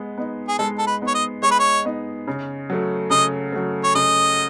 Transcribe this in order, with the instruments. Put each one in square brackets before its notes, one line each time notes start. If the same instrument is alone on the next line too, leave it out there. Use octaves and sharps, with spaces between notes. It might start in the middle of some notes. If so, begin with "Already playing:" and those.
Already playing: [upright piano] G#3 B3
B3 D#4
[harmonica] G#4
[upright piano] G#3 [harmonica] A4
[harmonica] A4
B4
[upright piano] B3 D#4
[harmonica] C#5
D#5
[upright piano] G#3 [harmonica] C#5
[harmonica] B4
C#5
[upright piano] B3 D#4
C#3
F#3 A3
[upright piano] C#3 [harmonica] D#5
[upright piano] F#3 A3
[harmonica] C#5
[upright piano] C#3 [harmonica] D#5